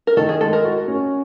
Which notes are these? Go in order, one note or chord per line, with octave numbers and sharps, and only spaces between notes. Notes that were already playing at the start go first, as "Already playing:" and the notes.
A#4
D#3 A4
G#4
G#3 A4
A#4
F#4
C#4